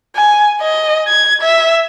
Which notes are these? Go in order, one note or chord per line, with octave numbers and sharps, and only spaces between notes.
G#5
D#5
G#6
E5